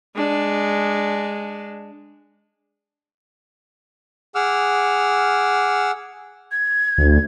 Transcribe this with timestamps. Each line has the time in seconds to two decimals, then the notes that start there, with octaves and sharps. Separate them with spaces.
0.16 G#3 D4
4.35 G#4 F#5 D6 E6 F6
6.52 G#6
6.98 D2